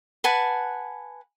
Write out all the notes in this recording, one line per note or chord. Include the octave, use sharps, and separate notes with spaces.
B4 F#5 G#5 A5